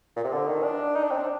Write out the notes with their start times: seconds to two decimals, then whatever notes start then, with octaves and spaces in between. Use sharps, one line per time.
0.16 A#2
0.24 C3
0.32 D3
0.48 D#3
0.64 D4
0.96 D#4
1.03 D4
1.11 C4
1.18 D4